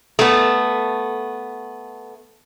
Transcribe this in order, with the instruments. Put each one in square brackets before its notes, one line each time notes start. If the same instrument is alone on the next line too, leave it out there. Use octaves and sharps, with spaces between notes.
[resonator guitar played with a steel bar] A3 B3